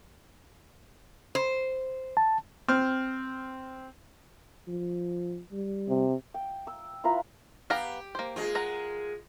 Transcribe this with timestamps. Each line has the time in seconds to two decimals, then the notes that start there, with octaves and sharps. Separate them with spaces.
1.35 C5
2.17 A5
2.68 C4 F6
4.68 F3
5.52 G3
5.89 C3
6.34 G5
6.67 E6
7.04 E4 F4 B4 A#5
7.70 B3 G4 F5 A#5
8.15 A#3 C5
8.36 G#3 F4
8.55 A#4 F#5 A#5